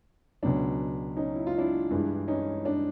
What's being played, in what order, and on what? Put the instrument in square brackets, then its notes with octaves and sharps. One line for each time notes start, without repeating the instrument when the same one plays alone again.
[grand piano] C#2 B2 F#3 D4
C#4 D#4
E4
F4
D4 E4
G2 E3 G#3
C#4 D#4
D4